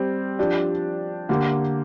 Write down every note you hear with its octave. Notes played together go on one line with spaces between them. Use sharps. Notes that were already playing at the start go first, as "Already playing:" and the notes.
Already playing: G3 C4 G4
F3 D4 G4
D3 A#3 G4